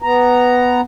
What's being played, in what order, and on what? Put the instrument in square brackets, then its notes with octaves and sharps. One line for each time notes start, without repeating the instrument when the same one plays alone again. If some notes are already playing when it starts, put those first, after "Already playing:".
[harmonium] B3 A#5